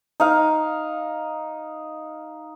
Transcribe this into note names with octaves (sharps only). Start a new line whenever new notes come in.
D#4 F5